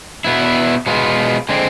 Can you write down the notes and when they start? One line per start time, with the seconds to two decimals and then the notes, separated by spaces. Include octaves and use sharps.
0.25 B2 B3 E4
0.86 B2 G#3 B3 F4
1.49 D3 G#3 C4